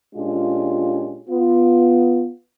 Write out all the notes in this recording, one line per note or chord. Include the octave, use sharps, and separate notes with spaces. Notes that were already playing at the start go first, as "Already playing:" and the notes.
A#2 G#3 C#4 D4 F4 G4
B3 F4